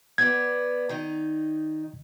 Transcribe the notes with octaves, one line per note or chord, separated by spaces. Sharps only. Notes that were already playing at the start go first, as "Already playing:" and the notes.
B3 D5 G#6
D#3 D#4